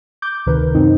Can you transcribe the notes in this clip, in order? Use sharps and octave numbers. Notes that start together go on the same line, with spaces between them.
D6 G6
D2 C3 D#3 A#4 B4
F#2 C4 D#4